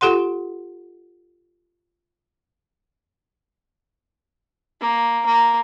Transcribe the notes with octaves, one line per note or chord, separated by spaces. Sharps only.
F4 G4 A4 F#5 C6
A#3
A#3